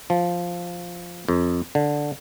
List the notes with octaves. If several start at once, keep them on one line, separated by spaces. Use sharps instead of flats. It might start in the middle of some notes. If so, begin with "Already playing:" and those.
F3
F2
D3